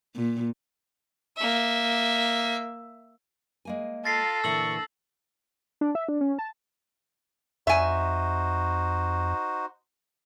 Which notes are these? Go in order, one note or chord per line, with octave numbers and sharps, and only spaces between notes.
A#2
A#3 E5
G#3 A#3 G#5
F4 A4 A6 A#6 C7
A#2 D3 E3 C#6 E6 F#7
D4
E5
D4
C#4
A5
F2 D#4 F#4 C5 E5 G#5